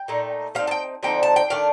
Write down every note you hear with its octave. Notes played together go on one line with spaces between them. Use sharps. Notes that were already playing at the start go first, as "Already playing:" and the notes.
Already playing: G5
A#2 A3 D#4
F3 C4 D#4 F5
A5
G5
D3 F3 C4 D#4 G5
A5
G5
D#3 A3 D4 F5